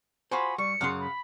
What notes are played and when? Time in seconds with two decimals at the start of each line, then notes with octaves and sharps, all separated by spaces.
0.31 F4 F#4 G#4 C5 B5
0.58 G3 C#6 C#7
0.81 F#2 C#3 F5 F#5 C6 D#6
1.00 B5